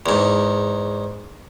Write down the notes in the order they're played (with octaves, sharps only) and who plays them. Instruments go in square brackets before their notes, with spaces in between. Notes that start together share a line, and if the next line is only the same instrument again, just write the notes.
[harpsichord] E2 G#2